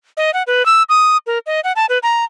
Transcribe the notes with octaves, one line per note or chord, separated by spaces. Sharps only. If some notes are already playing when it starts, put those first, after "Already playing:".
D#5
F#5
B4
E6
D#6
A#4
D#5
F#5
A5
B4
A#5